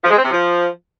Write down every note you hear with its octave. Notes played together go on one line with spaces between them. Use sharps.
F3
G#3
C4
C3
F3